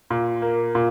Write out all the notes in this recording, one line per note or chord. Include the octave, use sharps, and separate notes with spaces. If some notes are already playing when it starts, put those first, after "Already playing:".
A#2
A#3
A#2